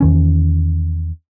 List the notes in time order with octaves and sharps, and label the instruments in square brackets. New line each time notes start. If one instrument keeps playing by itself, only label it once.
[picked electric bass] E2 D#3 C#4